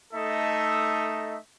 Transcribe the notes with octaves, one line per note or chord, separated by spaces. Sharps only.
A3 D#4 A4 D#5 E5